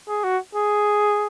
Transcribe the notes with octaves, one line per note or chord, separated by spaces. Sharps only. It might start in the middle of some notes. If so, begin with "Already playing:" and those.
G#4
F#4
G#4